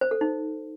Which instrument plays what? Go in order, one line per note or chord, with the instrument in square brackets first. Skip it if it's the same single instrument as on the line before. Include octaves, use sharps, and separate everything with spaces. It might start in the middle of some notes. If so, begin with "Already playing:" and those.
[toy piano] C5
A4
D#4